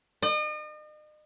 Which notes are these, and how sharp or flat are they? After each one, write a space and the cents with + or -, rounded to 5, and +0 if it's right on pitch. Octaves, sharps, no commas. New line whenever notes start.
D#5 -40